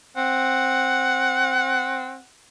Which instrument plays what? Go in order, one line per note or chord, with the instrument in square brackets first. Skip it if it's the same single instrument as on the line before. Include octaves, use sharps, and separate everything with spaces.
[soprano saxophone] C4 [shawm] F#5